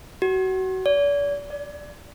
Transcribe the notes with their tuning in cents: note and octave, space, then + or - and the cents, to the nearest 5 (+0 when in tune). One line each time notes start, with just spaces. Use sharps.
F#4 +25
D5 -40
D5 +5